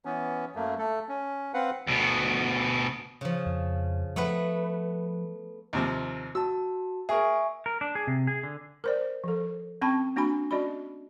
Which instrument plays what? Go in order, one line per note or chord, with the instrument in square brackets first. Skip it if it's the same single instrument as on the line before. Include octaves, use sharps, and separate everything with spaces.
[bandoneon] E3 B3 C#4
F#2 A3 A#3
A3 A4
C#4
C4 B4 F5 F#5
[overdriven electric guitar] D2 B2
[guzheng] C#3 F3
[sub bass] F2
[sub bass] F3 [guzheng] A3 B3 B4
[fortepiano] D#2 C3 F3
[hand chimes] F#4 A5 [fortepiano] E6
[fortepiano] G#4 A#4 [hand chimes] E5 G#5 C#6
[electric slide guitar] A#4
D4
G#4
C3
G#4
D3
[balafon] A#4 C5 D5
F3 A4
C4 C#4 G5 A5 B5 C#6
A#3 D4 F#4 G#5 B5
C#4 F#4 D5 D#5 B5